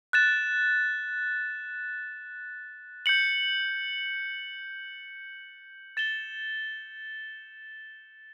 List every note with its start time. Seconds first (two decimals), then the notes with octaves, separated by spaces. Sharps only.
0.13 F#6 A6 E7
3.06 G6 C#7 F#7
5.97 A6 E7 G7